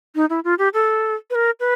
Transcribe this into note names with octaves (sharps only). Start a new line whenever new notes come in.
D#4
E4
F4
G4
A4
B4
A#4
B4